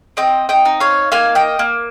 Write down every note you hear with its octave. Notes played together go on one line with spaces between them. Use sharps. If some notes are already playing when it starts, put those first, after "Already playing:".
C4 D#5 G5
D#5 G5
D#4
C#5 F5
A#3 F5 G#5
D#5 G5
A#3